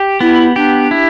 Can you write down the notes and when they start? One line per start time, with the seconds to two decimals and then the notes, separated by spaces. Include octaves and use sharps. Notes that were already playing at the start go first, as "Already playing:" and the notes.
Already playing: G4
0.21 B3 E4
0.56 D4 G4
0.91 E4